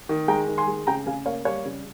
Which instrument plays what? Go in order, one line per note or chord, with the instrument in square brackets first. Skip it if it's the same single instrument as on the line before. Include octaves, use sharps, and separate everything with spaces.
[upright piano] D#3
G#3 G5 A#5
D#3
G#5 C6
G#3
C#3 G5 A#5
C#3 F5 G#5
A#3 C#5 F5
G3 C#5 F5
C#3